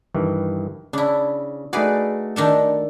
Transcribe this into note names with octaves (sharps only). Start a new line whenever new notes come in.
G2 D#3 E3
C#3 D4 E4
A3 D#4 F#4 G#4 B4 D5
D#3 D4 A4